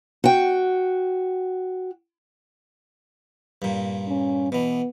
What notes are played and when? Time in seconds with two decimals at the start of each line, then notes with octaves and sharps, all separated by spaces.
0.24 F#4 G5
3.62 G2 A#2
4.09 C#4
4.52 B2 E3 B3